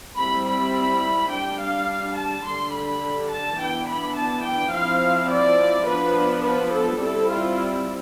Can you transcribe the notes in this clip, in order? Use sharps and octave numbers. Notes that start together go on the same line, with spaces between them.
G3 C4 E4 B5
B5
G3 D4 G5
F5
A5
D3 G3 D4 C6
B5
A5
E3 B3 D4 G5
B5
A5
G5
F3 C4 E4 F5
D5
F3 B3 D4 B4
B4
A4
G3 C4 E4 A4
F4